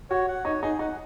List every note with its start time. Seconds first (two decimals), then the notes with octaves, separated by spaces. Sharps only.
0.10 F#4 C#5
0.28 F#5
0.45 D#4 C#5
0.62 D#4 G#4
0.79 D#4 F#5